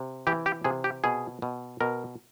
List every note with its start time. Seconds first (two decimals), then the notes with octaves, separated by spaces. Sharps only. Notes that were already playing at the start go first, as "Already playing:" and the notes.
Already playing: C3
0.27 E3 G4
0.46 G4
0.64 C3 G#4
0.84 G4
1.04 B2 G#4
1.42 B2
1.81 B2 A#4